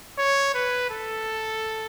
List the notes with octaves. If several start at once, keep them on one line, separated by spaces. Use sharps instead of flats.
C#5
B4
A4